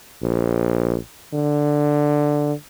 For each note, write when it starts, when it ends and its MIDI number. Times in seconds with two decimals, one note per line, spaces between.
0.23 0.96 34
1.33 2.53 50